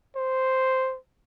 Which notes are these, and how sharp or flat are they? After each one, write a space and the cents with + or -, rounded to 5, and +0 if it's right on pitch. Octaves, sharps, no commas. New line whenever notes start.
C5 -5